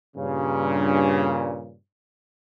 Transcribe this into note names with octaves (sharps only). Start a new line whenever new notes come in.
G2 A#2 C#3